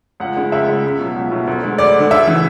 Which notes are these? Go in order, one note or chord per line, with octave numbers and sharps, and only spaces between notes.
C#2 F#5
C#3 G#3
C#2 E5
C#3 G#3
C#2
B2 F#3
C#2
B2 F#3
D2
D3 G#3
D2 D5
D3 G#3
D2 E5
C#3 E3